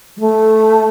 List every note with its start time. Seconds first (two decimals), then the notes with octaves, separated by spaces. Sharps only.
0.17 G3
0.20 A3